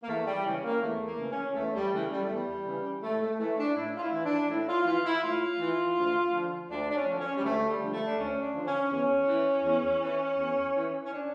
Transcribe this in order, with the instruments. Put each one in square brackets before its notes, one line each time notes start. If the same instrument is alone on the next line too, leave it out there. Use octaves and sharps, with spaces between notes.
[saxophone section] A#3
E2 A3
G3
C#3 E3 C#4
A#3
E2 A3
A#3
C#3 E3
C#4
E2 A3
G3
C#3 E3 A3
G3
A3
E2
G3
C#3 E3
A2 A3
A3
E3 A3
D4
A2 E4
F4
E4
E3
D4
A2 E4
F4
E3 F4
E4
A2 F4
E3
D2
D3 F3
D2 D4
D4
C#4
D3 F3
C#4
G3
D2 A3
G3
D3 F3
A3
D4
D2 C#4
D4
D3 F3
C#4
E2 C#4
E3
E2
E3
E2
E3
C#4
D4